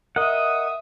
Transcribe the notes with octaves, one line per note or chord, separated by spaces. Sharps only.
A#4 D#5 E5 F#5 D#6